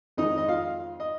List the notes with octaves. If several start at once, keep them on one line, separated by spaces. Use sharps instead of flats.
F2 D#3 G#3 D#4 D#5
D#5
F4 F5
D#5